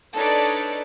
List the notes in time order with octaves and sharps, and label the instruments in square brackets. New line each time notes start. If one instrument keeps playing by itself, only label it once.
[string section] D4 D#4 A4 B4 C#5 D5